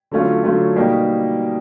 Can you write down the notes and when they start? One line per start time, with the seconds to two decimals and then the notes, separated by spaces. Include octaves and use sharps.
0.11 D3 F#3 A3 C#4 F4
0.44 D3 F#3 A3 C#4 F4
0.76 B2 G3 A#3 D#4 G4